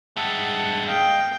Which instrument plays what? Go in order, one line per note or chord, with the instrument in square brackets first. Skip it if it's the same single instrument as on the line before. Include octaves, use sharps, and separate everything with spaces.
[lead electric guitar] G2 G#3 [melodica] E5 F#5 A5
[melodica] D#5 F5 [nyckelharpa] G5